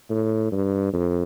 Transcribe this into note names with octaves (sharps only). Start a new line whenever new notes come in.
A2
G2
F2